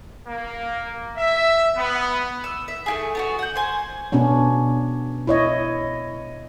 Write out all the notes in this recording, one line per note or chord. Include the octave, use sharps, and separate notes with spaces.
A#3
E5
B3
E6
E5
A3 E4 G#4
B3 D4 F#4
F#5 G6
C5 G#5
B2 B3 C#4 D4
E4 C#5 D#5